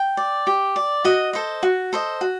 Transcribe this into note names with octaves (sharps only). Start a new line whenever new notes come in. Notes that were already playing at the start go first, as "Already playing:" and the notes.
Already playing: G5
D5
G4
D5
F#4 D#5
A4 C5 D#5
F#4
A4 C5 D#5
F#4